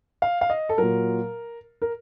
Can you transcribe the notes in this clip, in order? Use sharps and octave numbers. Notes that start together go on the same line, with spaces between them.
F5
F5
D#5
A4
A#2 F#3 A#4
A#4